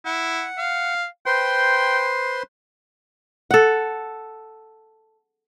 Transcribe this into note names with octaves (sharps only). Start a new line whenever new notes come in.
E4 F#5
F5
B4 C5 G5 C6
A4 F#5